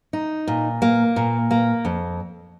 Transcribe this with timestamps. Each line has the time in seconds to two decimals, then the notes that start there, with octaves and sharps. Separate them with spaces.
0.13 D#4
0.47 A#2
0.82 A#3
1.16 A#2
1.51 A#3
1.85 F2